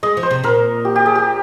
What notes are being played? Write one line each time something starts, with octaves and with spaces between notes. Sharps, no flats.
G#3 D#5
F3
C5
C3
A#2 A#4
G4
G4
G#4
G4